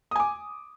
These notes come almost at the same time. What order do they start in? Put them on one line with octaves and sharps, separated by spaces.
D#6 G#5 D6